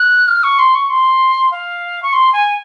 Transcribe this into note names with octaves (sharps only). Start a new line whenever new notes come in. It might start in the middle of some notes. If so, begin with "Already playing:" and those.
Already playing: F#6
F6
C#6
C6
C#6
C6
F5
C#6
C6
G#5